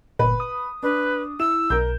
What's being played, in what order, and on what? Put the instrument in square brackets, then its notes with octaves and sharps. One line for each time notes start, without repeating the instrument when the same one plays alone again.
[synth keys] G1 A#2 [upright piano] B4
[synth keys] D#6
[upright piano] D4 [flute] B4
[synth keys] E4 [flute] E6 [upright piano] E7
[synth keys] B1 [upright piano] A#4 G6